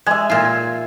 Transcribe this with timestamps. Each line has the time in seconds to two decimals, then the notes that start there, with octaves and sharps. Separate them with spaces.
0.06 G#3 E5 G#5
0.30 A#2 F4